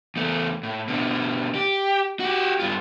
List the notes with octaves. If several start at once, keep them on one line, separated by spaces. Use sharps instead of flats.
E2 A3
A2
B2 D3
G4
F#4 G4
G2 F4